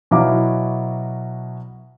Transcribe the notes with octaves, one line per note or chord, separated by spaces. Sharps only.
B2 F#3 E4 F5 A#5 D6